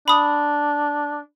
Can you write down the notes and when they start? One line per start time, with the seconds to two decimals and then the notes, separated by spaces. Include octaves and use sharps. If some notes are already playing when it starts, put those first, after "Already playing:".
0.08 D4 B5 D#6